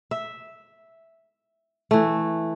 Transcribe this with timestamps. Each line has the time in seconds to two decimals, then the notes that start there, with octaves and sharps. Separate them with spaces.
0.11 E5
1.91 E3 A3